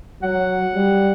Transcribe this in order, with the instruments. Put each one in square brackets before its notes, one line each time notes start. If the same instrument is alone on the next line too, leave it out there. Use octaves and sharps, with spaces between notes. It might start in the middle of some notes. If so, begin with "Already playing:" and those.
[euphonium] F#3 [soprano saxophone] F#5
[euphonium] G3